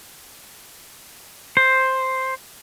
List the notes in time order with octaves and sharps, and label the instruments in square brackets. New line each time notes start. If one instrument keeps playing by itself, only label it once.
[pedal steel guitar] C5